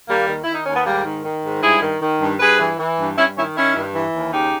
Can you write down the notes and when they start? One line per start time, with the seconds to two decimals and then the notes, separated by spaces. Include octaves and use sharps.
0.08 D#2 G3 A#3
0.28 D#3
0.44 D#3 E4
0.54 D#4
0.65 D#2 C#4
0.75 B3
0.86 G#2 G3 A#3
1.04 D#3
1.24 D#3
1.43 G#2
1.62 G2 E4 G#4
1.82 D#3
2.01 D#3
2.20 G2
2.40 G2 G#4 B4
2.59 E3
2.79 E3
2.98 G2
3.17 G2 C#4 E4
3.36 D#3 C#4 E4
3.56 D#3 C#4 E4
3.75 G2
3.94 E3
4.13 D#2
4.32 C#3 D#4 G4